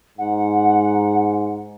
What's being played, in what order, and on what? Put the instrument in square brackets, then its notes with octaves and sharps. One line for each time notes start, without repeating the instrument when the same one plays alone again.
[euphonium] G#2 [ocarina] F#5